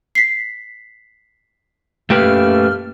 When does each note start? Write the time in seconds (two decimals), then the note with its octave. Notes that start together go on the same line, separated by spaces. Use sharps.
0.15 B6 C7
2.10 F#2 A3 A#3 G4 B4 F6